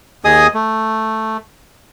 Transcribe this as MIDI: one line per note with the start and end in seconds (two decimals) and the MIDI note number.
0.25 0.47 39
0.25 0.47 68
0.25 0.47 75
0.25 0.47 80
0.25 0.47 87
0.54 1.37 57